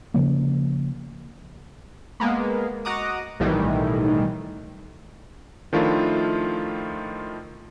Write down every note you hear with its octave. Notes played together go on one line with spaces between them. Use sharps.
C#3 F3 A#3
G#3 A#3 B3
F#4 D#5 F#5 A#5 D6 D#6
B1 A2 D#3 E3 G3
D#3 F3 A3 D4 E4 F4